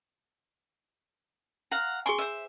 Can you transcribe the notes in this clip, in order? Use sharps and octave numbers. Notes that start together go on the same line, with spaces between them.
F5 F#5 A#5
G#4 G#5 C6 C#6
C5 E5